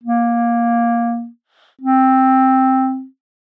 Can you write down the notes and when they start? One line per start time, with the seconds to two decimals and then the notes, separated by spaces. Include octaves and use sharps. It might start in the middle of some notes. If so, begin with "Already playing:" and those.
0.04 A#3
1.81 C4